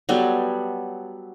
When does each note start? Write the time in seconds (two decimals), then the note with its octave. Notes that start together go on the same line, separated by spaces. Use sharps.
0.09 F#3 G3 B3 A4